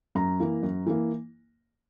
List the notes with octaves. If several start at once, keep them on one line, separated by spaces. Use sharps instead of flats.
F#2 A#5
E3 A#3
F#2
E3 A#3